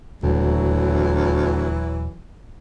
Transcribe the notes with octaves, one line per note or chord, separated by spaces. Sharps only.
D#1 D2 E3 F#3